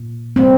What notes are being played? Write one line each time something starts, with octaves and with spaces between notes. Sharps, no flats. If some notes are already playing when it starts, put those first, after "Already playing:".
Already playing: A#2
D#3 G3 A#3 C4